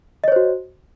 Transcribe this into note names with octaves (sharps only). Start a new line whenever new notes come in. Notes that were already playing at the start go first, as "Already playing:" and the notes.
F#4 C5 C#5 D#5